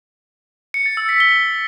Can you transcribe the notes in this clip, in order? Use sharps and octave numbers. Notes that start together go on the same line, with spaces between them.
C#7
A6
E6
B6
G7